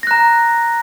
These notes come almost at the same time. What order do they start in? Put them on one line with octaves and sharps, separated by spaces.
A#6 F#6 A#5